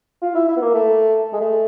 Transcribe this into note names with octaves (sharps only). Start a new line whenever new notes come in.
F4
E4
E4
B3
A#3
A3
G#3
A3